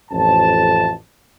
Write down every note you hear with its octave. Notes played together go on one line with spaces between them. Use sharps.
A1 F2 A5